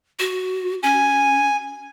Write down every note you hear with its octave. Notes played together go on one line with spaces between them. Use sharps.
F#4
C#4 G#5